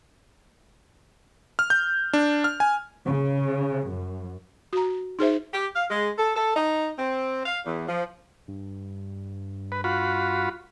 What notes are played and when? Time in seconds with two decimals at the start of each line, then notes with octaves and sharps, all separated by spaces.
1.59 F6
1.70 G6
2.13 D4
2.44 F6
2.60 G#5
3.06 C#3
3.90 F#2
4.73 F#4 A#5
5.19 D#4 G#4 C5 E5
5.52 G4
5.76 F5
5.90 G#3
6.18 A4
6.36 A4
6.56 D#4
6.99 C4
7.46 F5
7.67 E2
7.89 F3
8.48 G2
9.72 B4
9.84 F4 F#4 B5